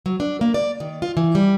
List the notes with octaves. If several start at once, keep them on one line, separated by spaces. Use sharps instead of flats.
F#3
D4
A#3
D5
D#3
F4
E3
G3